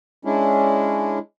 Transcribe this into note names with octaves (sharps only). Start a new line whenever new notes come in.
G#3 C#4 D4 E4